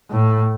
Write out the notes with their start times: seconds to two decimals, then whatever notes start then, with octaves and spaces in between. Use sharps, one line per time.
0.11 A2